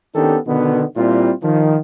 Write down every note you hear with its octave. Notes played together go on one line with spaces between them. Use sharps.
D#3 B3 C#4 D4 G4 A4
B2 D3 D#3 B3
A#2 G3 C4 E4 F4
D#3 F3